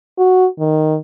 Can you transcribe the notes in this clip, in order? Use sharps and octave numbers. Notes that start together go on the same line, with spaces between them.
F#4
D#3